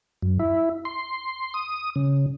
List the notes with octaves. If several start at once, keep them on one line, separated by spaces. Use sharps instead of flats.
F#2
E4
C6
D#6
C#3